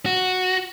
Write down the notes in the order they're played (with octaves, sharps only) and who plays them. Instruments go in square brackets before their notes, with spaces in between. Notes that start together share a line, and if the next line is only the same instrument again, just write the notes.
[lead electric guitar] F#4